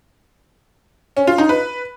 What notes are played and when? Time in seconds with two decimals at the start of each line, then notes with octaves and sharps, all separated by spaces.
1.17 C#4
1.27 F4
1.38 D#4
1.49 B4